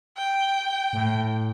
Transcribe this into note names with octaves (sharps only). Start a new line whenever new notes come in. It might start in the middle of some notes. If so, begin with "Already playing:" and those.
G5
A2